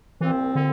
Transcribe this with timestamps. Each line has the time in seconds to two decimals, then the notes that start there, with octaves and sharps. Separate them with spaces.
0.21 C2 A#2 E3 F3 C4
0.55 D3